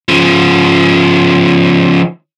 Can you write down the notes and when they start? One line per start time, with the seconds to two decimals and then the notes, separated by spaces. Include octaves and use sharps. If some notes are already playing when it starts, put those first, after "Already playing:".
0.09 C#3 F3